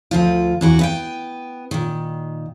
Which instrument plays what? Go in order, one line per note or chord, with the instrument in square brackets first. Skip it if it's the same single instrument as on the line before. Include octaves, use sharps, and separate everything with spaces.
[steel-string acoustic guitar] D2 F3 F4
E2 E3 F#4
B3 E5 G5
A#2 D#3